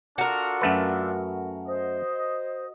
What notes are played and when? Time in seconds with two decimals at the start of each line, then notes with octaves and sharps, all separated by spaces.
0.18 D4 F4 F#4 A4 A#4
0.61 F#2 A3 B4
1.67 C5 D#5